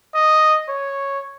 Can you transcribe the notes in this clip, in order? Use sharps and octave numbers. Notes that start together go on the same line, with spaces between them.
D#5
C#5